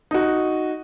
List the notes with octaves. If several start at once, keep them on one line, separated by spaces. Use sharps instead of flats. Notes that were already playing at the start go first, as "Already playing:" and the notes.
D#4 F#4